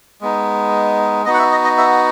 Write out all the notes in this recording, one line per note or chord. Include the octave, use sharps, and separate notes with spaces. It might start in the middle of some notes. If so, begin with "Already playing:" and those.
G#3 B3 D#4
B3 D#4 F#4 D#5
F#5
E5
D#5
D#5
E5